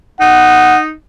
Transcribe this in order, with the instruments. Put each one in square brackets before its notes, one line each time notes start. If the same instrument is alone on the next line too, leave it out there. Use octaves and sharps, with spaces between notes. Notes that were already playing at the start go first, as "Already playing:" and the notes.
[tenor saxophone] D#4 [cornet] F#5